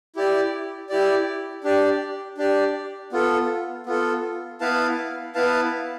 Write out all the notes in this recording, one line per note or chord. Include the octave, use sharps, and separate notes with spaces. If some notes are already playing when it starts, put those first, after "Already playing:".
E4 G4 D5
E4 G4 D5
D4 G4 D5
D4 G4 D5
B3 F4 A4
B3 F4 A4
B3 E4 B4 F5 A5
B3 E4 B4 F5 A5